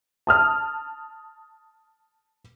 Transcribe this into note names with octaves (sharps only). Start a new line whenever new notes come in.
A5 D#6 F6